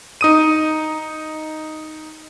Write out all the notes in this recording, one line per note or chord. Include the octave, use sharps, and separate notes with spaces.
D#4 D#6 D#7